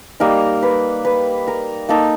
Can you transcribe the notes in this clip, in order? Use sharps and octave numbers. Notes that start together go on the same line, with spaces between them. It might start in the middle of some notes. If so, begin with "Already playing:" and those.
G3 A#3 D#4 A#4
B4
B4
A#4
A#3 D#4 A4